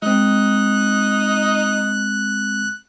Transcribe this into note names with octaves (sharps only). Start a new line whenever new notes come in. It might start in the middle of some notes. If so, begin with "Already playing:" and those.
G#3 C4 D#4 F#6